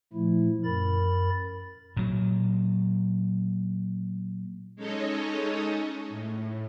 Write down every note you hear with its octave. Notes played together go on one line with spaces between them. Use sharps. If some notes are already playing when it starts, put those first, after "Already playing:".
A#2 F3 A3 E4
F#2 A#4 B5 A6
A#2 F#3
G#3 C#4 D#4 A4 C#5 D#5
A2